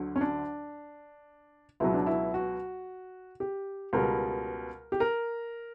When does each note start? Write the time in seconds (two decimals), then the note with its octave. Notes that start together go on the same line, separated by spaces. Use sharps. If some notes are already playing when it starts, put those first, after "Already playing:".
Already playing: D2 D3 F#3
0.16 C#4
0.21 D4
1.80 C#2 B2 F#3 E4
1.94 D4
2.06 E4
2.34 F#4
3.40 G4
3.93 C#2 B2 G3 A#4
4.92 G4
5.00 A#4